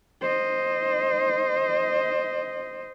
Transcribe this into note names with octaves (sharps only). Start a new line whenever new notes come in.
C5 D#5